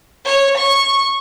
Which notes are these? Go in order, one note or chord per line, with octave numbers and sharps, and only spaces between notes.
C#5
C#6